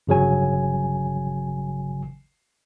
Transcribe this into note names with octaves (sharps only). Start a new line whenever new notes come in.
G1 C#3 F#3 G#5